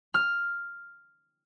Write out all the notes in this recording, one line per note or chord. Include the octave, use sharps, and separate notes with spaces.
F6